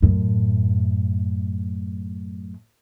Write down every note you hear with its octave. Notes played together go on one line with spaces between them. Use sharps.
F#2 A2